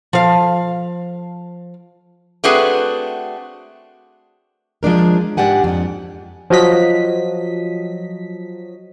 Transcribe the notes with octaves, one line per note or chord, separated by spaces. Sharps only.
F3 F5
A3 C4 D4 F#4 G#4 B4
F3 G#3 D4 A#4
G#2 D4 G4 F#5 G#5
F2
F3 F#3 D#5 B6